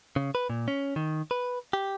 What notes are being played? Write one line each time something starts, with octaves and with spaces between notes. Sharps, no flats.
C#3
B4
A#2
C#4
D#3
B4
G4